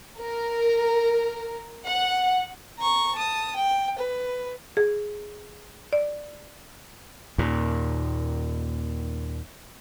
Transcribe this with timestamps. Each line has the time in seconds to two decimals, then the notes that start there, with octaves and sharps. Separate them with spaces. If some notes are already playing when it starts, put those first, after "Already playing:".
0.19 A#4
1.87 F#5
2.79 A#5 C#6
3.15 A5 D#6
3.56 G5
3.98 B4
4.77 G#4
5.93 D5
7.38 D#2 A#2